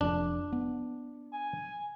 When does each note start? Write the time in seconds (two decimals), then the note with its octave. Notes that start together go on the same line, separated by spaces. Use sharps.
0.01 F1 F2 D4
0.52 B3
1.33 G#5